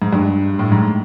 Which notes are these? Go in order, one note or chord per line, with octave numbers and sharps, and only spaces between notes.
G#2
G2
A2
G#2